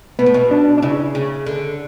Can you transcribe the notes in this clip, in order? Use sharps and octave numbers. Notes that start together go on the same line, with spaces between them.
B2 B3
A2
B2
D4
D4
C#3 E4
C#3
D3